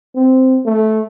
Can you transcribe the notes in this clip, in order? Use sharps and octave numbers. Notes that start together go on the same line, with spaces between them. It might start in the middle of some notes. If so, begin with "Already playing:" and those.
C4
A3